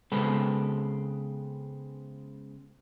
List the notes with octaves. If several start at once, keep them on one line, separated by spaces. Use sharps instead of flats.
C#3 G#3 B3 C4 A4 B4